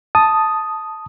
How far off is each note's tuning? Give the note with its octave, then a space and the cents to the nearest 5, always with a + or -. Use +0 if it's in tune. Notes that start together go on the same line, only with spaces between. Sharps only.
A5 +0 D#6 +0